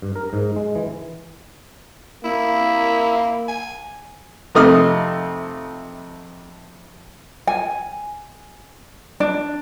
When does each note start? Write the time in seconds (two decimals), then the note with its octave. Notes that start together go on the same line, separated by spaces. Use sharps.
0.02 G2
0.16 A#4
0.33 G#2
0.56 G#3
0.76 E3
2.25 A#3 E4
3.48 G#5
4.55 F2 C3 A3 D#4 D#6 F6
7.47 G#5
9.20 D4